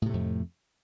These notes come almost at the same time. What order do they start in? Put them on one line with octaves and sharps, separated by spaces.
A2 C3 A3 F2